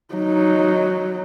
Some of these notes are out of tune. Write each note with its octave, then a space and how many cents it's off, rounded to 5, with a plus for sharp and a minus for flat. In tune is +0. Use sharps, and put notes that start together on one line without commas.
F#3 +0 D#4 +0